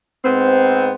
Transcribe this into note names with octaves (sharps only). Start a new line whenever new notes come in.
G#2 B3 C4